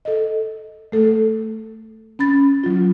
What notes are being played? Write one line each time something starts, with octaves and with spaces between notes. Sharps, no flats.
A4 D#5
A3 A4
C#4 B5 A6
F#3 F4